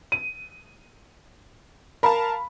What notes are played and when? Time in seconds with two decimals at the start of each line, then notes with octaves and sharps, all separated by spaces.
0.12 D#7
2.03 A#4 F5 A5 B5